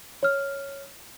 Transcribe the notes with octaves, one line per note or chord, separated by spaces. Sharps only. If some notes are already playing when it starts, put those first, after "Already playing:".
C#5 F6